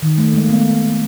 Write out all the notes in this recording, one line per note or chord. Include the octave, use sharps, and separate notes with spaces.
D#3
A3
G#3 A#3
A3 B3